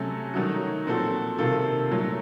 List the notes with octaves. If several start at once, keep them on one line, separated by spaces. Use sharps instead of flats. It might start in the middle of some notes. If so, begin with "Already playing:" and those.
Already playing: C3 F#3 A3 C#4 A4
D#3 F#3 A3 D#4 F#4
A#2 F3 C4 F#4 A4
C3 D#3 A#3 F4 A4
A#2 F#3 A3